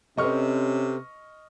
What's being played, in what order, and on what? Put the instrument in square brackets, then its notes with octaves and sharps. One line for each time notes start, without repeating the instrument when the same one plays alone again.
[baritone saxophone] C3 [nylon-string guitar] C4 A4 B4 [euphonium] C#4 [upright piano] D#5 C#6 F6